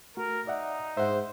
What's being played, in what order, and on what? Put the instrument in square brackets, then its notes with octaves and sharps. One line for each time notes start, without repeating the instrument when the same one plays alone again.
[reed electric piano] A3 F#4 [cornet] A#4
[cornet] D#4 [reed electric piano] D5 E5 F#5
[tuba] G#2 [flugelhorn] C5 [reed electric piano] E5 F#5